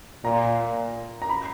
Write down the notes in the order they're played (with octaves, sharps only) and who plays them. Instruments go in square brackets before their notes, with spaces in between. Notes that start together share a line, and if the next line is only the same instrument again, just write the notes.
[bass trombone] A#2 [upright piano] A#5
[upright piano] A#5
B5